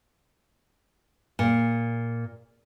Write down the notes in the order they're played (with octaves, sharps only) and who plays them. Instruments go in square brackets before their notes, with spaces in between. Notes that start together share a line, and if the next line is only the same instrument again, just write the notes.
[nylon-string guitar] A#2